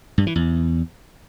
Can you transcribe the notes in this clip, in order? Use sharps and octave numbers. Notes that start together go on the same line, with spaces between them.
G2
E3
E2